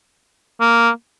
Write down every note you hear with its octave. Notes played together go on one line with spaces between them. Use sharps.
A#3